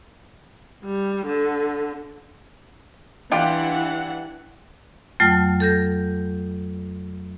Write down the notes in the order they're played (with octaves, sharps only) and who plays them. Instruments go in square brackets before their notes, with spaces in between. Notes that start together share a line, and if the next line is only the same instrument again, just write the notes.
[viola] G3
D3
[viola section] E3 D4 F#5 [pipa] G3 F4 G4
[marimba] F2 F#3 A3 G5 F6
A4 G6 A#6